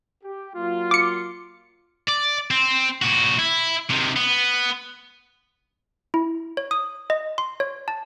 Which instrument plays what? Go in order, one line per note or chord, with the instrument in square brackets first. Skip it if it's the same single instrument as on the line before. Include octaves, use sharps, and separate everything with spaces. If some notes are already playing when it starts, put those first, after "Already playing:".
[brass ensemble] G4
F#3 A#3 F4
[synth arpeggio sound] D6 C#7
[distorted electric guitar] D5
C4
A#2 F#4
E4
C3 D#3
B3
[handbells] E4
C#5
D#6
D#5
C6
C#5
A5